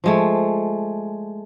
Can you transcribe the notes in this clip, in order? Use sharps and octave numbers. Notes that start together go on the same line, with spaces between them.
F3 G#3 A3